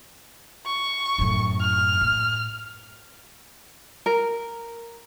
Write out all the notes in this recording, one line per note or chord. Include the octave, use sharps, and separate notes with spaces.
C#6
F#2 A2
F6
A2
A#4